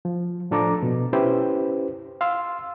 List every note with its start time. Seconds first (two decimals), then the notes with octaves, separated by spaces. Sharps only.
0.05 F3
0.51 A2 F3 D4 A4 A#5 D6
0.83 B2
1.13 C#4 E4 G4 B4 C5
2.21 F5 C6 E6